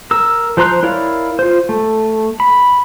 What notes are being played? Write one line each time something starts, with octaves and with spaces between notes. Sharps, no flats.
A#4 E6
F3 C5 A#5 C6 F#6
E4 A#4 C#5 D5 F5
F4 C5
A3
B5